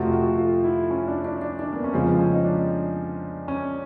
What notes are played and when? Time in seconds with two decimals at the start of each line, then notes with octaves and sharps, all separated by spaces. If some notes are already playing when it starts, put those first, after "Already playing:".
Already playing: F2 C3 F3 A3 F#4
0.13 F#4
0.38 F4
0.64 E4
0.90 C#4
1.08 D4
1.25 D4
1.42 D4
1.59 D4
1.73 A#3
1.75 B3
1.84 C#4
1.93 F2 C#3 F3 G#3 C4
2.19 C#4
2.33 D#4
2.45 D4
3.48 C#4